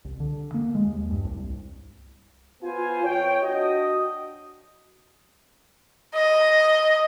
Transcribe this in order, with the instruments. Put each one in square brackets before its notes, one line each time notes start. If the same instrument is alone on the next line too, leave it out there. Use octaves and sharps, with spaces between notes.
[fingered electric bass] C2
D3
A#3
G#3
D#2
G2
C2
[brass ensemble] B3 F4 C5 G#5
F2 C#5 G5
D4 F#4 D#5
[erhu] D#5